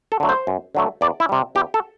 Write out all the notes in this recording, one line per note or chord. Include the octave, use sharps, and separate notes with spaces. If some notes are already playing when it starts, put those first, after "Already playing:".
A4
D3 F#3 A3
C5
F#2
D3 F#3 A3
E2 D5
E4
C3 G3
E2 G4
A4